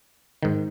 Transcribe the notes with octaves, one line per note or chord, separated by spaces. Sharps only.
G#2 D#3